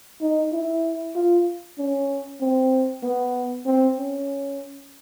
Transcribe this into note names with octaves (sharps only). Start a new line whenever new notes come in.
D#4
E4
F4
C#4
C4
B3
C4
C#4